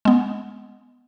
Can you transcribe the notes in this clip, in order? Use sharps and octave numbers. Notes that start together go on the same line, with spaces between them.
G#3 B3